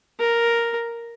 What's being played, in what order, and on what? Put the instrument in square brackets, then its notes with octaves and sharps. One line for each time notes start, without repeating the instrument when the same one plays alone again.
[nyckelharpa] A#4